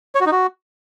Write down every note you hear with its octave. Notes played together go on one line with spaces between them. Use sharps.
C#5
F#4
D#4
F#4